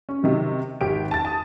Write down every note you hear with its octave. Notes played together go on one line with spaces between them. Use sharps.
C#4
C3 D#3 F#3
G#1 G4 D7
A5 A6
A5 D#6